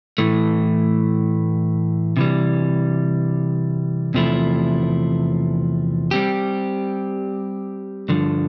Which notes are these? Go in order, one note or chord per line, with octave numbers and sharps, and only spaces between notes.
A2 E3 A3
C3 E3 G3
E2 C3 F3 A3 E4
G3 C4 G4
G2 D3 F3